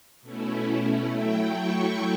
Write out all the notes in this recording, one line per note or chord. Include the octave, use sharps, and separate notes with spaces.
B2 A3 C#4 E4
F#3 A3 E4 G5
C#6